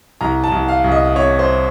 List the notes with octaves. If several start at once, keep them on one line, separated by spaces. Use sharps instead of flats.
C2 A#5
A5
C2
F5
C2
D#5
C3 C#5
C5